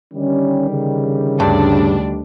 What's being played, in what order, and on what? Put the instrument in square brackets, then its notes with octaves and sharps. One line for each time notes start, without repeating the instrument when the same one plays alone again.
[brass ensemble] D3 D#3 G3 [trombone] C#4
[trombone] C#3
[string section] D2 D4 [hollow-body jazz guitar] G2